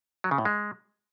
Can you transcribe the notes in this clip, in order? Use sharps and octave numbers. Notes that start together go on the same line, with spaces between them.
F#3
C#3
A2
G#3